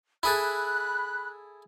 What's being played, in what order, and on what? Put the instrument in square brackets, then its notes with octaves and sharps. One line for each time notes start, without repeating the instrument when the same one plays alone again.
[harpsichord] E4 G#4 A4 [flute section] B5 F#6